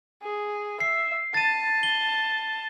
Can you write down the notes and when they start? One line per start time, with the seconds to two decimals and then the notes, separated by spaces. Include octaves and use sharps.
0.22 G#4
0.80 E5 C7
1.34 A5 A6 D#7
1.83 G7